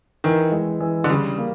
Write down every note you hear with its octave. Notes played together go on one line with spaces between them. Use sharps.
D#3 E3
G#3
E3
D3
C#3 G3
A#3